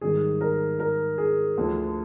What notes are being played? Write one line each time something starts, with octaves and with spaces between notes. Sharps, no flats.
G#2 D#3 G3 G#4
A#4
A#4
G#4
D2 D3 F3